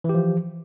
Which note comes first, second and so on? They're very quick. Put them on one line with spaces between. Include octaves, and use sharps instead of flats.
E3 G4 F3